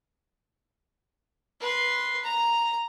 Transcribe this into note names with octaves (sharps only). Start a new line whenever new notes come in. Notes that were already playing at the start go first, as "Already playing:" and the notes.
B4 C6
A#5